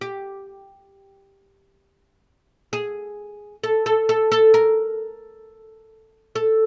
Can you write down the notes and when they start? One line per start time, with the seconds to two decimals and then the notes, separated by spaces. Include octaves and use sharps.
0.01 G4
2.73 G#4
3.64 A4
3.86 A4
4.09 A4
4.32 A4
4.54 A#4
6.35 A4